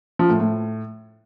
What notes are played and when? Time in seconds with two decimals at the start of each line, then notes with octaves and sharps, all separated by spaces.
0.19 F3
0.30 A2
0.40 A2